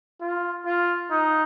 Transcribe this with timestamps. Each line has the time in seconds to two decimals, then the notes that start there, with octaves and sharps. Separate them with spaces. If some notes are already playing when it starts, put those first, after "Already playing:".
0.21 F4
0.66 F4
1.11 D#4